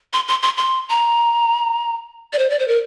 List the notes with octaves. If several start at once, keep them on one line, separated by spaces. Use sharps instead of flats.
C6
C6
C6
C6
A#5
D5
C5
D5
C5
A#4